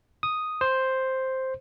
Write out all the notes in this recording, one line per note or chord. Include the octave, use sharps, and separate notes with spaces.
D#6
C5